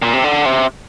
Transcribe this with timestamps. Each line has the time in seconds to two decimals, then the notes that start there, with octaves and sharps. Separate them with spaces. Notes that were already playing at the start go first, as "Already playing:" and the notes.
0.02 A#2
0.14 C3
0.24 D3
0.46 C3